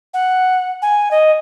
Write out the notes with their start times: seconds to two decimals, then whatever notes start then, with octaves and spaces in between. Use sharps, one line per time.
0.14 F#5
0.82 G#5
1.11 D#5